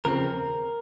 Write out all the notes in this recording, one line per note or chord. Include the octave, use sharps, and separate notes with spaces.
D#2 C#3 F3 C4 A#4